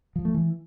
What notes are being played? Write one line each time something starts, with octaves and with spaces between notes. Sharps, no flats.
F3
A3
E3